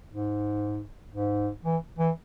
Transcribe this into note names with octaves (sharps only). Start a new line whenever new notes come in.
G#2
G#2
E3
E3